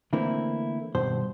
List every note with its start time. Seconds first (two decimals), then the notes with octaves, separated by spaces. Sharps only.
0.13 D3 E3 A3 A#3 C4 E4
0.95 G2 B2 D#3 C5